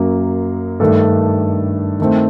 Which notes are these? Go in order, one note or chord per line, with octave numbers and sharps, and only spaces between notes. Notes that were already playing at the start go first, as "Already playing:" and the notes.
Already playing: F#2 F#3 A#3
G2 D#3 A3 D4 A4
D#3 A3 C4